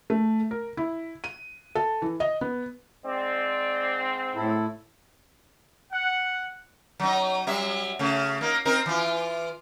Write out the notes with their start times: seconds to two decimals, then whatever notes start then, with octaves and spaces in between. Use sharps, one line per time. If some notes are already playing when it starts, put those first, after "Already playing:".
0.10 A3
0.51 A#4
0.77 E4
1.24 D#7
1.75 A4
2.02 E3
2.20 D#5
2.41 B3
3.05 G#2 C4 D5
4.35 A2 E4 A4
5.92 F#5
7.00 F#3 D#4
7.47 F#3 G3 E5
7.99 C#3 A3
8.41 A#3 D#4
8.65 C4 D#4 A#4
8.86 E3 F4